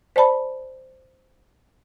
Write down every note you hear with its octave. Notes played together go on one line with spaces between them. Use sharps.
C5 D5 A5 B5